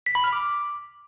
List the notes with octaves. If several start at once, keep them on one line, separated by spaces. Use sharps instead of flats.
B6
B5
F6
D6